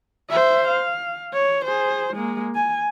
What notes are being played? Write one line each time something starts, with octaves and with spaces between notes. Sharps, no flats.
C5 E5
F5
C#5
G#4 C5
G#3 A#3
G#5